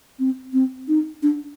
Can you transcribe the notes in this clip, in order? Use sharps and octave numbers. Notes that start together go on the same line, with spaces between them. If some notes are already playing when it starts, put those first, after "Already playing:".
C4
C4
D#4
D4